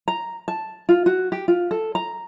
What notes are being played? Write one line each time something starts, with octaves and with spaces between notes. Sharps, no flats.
A#5
A5
F4
F#4
G4
F4
A4
A#5